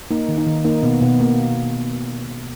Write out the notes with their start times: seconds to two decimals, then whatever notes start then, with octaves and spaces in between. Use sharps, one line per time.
0.11 A#3 D#4
0.29 D#3
0.38 D#4
0.47 D#3
0.65 A#3 D#4
0.83 B2 B3
1.01 B2 B3
1.20 A#3